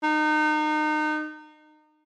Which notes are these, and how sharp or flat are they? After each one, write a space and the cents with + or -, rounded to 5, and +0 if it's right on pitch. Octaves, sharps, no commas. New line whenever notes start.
D#4 -30